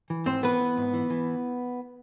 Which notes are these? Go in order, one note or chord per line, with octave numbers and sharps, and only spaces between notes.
E3
G#2 C4 C5
E3 B3 B4
E3
G#2
E3
E3